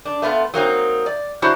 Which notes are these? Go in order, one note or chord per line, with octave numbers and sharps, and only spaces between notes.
D4
A3 B3 E4 F4
F#3 A#3 C4 D#4
D5
F#3 D4 E4 F#4 C5